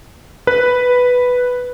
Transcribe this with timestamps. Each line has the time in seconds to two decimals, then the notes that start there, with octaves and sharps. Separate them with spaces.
0.47 B4